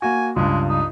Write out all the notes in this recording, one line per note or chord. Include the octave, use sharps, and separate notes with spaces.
A#3 F#4 G#5
C#2 G2 G#3
D#4